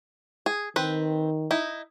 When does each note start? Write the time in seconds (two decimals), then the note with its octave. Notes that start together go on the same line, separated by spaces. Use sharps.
0.46 G#4
0.76 D#3 C4 B4
1.51 D#4 E4